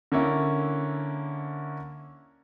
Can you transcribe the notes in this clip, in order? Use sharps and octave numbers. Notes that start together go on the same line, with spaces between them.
D3 A#3 C#4 E4